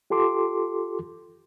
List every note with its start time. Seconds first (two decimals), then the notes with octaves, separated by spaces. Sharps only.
0.10 F4 G4 A4 C6 D6